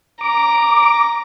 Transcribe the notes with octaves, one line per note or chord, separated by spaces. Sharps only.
A#5 D6